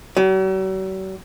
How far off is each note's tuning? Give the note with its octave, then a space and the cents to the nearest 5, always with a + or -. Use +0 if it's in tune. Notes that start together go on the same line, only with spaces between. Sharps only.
F#3 +45